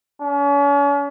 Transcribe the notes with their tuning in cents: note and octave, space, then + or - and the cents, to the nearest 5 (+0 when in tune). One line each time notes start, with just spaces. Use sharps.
C#4 +40